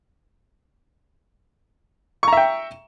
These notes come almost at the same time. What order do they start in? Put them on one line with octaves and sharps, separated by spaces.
C#6 A#5 E5 G5